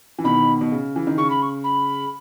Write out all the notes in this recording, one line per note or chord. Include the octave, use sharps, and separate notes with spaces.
E3
B2 D#3 B5
B2
C#3
E3
D#3
C#3 C#6
B5
C#6
B5